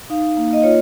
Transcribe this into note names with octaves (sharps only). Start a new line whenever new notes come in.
D#4 F5
A#3
D#5
F4 C#5